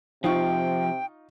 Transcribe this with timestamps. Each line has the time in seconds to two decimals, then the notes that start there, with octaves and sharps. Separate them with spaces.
0.24 C3 F3 D#4 F4 G5 C#6